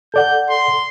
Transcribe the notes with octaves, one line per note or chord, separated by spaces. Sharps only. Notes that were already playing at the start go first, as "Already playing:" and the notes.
A4 D5 F#5 G6
C6